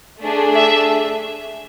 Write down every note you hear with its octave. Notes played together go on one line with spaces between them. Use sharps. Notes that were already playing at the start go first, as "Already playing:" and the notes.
A3 D4 G#4
E5